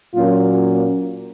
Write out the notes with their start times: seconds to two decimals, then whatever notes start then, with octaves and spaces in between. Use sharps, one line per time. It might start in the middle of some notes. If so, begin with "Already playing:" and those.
0.14 A#2 F#3 A#3 C#4 F4